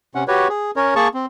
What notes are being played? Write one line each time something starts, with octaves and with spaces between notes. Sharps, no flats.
C3 C#4 F#5
F#4 G4 B4 C#5
G#4
C#4 A#4 C#5
A#3 G#4 A5 C#6
C4